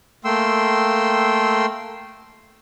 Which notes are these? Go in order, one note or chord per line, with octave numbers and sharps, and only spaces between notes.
A3 A#3 G5 C6 E6